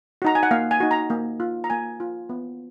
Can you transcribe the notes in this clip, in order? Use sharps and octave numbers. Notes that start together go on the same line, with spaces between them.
D#4 F#4 A#5
G#5
F#5
A#3 F5
G#5
D#4 F#4
A#5
A#3
F4
A#5
A#3 G#5
F4
B3